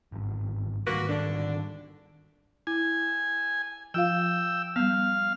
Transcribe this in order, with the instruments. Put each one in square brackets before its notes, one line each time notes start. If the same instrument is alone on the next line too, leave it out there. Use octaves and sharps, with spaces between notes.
[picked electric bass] G#1 G2
[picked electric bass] G#2 D#3 G3 [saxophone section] A#3 F#4 B4
[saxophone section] D3 D4
[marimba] E4 [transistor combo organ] G#5
[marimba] F3 F4 F5 [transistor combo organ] G5 E6
[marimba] G3 B3 [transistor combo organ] F5